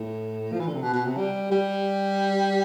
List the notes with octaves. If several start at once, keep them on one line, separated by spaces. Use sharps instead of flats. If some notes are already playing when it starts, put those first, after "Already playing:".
Already playing: A2
F3
E3
D3
C3
B2
B2
C3
G3
G3